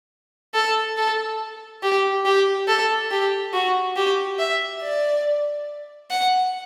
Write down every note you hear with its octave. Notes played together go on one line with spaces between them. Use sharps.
A4
A4
G4
G4
A4
G4
F#4
G4
E5
D5
F#5